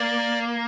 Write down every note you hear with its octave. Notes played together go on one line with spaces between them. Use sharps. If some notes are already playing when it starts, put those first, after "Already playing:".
Already playing: A#3 D5